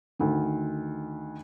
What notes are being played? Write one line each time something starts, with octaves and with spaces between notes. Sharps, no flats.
D2 D#3